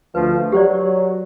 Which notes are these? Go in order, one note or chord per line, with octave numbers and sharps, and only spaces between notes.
D2 F3 A3 B4
F#3 G4 C5 D5